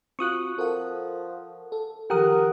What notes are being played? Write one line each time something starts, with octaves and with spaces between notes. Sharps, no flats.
C4 F4 F#4 C#6 D#6 F#6
F3 A4 A#4 F#5
A4
D#3 F3 G4 A#4 F#5 D#6 F#6